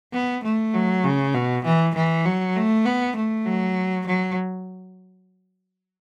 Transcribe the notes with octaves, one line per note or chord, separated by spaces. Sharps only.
B3
A3
F#3
C#3
B2
E3
E3
F#3
A3
B3
A3
F#3
F#3